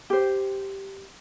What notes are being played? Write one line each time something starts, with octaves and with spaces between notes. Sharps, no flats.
G4 C5